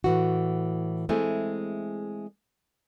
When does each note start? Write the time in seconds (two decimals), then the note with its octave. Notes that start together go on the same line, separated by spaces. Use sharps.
0.04 A2 E3 F#4
1.09 G#3 A3 C4 E4 G#4